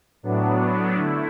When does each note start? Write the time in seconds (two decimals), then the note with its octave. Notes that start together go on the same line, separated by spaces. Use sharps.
0.23 A2 F#3 B3 D4
0.96 D3 A3 E4